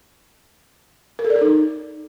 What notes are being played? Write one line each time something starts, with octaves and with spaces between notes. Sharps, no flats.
A#4
A4
D5
A4
D#4